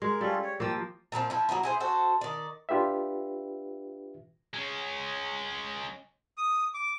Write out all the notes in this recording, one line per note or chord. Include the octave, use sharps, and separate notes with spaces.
G#3 A#4
G3 C#4 F4 A4
C#5
F3 A#3 G5 E6
A#2 F3 A#3 C4
F3 E4
F#3 A#3 B3 E4
E4 G#4 C5
F#4 A4 C5
D#3 D5
D4 F4 G4 B4 E5
G#3 C#4
D#6
D6